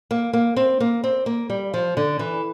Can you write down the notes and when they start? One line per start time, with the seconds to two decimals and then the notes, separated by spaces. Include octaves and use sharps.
0.11 A#3
0.33 A#3
0.56 C4
0.80 A#3
1.04 C4
1.26 A#3
1.50 G3
1.74 F3
1.97 D3
2.19 E3